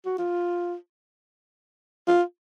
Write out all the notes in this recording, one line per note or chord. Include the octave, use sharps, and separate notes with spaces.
F#4
F4
F4